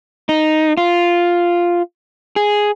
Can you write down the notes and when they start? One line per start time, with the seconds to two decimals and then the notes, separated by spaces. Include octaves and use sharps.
0.29 D#4
0.77 F4
2.36 G#4